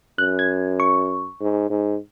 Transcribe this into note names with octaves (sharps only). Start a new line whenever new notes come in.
F#2 F#6
G#6
C#6
G#2
G#2